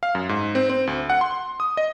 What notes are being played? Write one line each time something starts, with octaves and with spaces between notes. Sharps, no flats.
F5
F#2
G#2
C4
C4
D2
F#5
C6
D#6
D#5